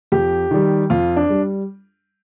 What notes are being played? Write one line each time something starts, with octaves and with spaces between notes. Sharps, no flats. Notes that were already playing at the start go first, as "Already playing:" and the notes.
F2 G4
D#3 G3
F2 F4
D4
G3